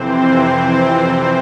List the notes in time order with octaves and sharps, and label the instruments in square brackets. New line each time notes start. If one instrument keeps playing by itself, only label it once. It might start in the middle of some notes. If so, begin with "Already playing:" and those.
Already playing: [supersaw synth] F2 C3 E3 C4 C5